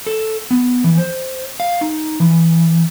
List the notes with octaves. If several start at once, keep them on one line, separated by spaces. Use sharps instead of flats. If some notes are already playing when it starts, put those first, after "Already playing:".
A4
B3
E3
C5
F5
D#4
E3